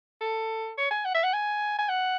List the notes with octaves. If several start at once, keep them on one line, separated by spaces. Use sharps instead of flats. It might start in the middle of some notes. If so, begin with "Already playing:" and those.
A4
C#5
G#5
F#5
E5
F#5
G#5
G#5
F#5